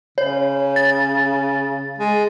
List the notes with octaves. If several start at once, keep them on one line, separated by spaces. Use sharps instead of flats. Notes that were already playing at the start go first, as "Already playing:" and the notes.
C#3 C#5
A6
G#3